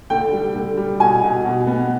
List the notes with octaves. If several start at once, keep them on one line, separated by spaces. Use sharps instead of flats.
D3 G5
G3
D3
G3
B2 G#5
B2
B2
B3